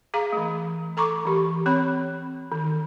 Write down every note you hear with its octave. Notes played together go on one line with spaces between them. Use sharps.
G#4 F5 A#5
E3 A3
A4 A#5 C#6 D6
E3 G4
C4 C#5 B5
D#3